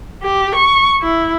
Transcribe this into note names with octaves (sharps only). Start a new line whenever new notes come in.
G4
C#6
E4